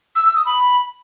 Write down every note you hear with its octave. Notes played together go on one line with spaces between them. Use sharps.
E6
E6
D#6
B5